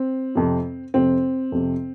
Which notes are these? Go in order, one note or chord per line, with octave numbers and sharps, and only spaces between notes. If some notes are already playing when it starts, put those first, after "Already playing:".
Already playing: C4
F2 C3
F2 C3 C4
F2 C3